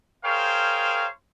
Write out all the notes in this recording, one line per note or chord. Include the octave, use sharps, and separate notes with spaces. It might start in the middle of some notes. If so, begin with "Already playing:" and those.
G#4 A#4 C5 C#5 F5 G5